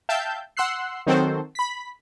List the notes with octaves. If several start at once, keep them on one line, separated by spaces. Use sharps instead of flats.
E5 F5 G5 A5 E6 G6
F#5 C6 E6 F#6 C7
D#3 F#3 C4 F#4 A4 C5
B5 B6